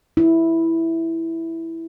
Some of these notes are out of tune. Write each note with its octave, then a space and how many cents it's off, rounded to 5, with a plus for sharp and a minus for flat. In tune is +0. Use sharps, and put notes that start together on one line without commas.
E4 -5